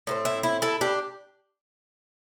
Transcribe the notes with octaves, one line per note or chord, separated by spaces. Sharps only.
A2 A3 C4
E4
E4
E4 A4
D4 G4